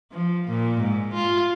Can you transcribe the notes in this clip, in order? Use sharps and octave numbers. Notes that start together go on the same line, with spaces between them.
F3
A#2
G#2
F4